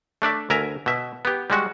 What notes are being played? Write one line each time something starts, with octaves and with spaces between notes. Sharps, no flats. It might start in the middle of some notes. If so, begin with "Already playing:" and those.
A3 D4 D5 E5
D2 A#4 E5 G#5 A#5
B2 E5
B3 G4
G3 G#3 F#4